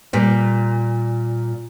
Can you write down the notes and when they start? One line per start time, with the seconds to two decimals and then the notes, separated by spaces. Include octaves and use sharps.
0.13 A#2 G3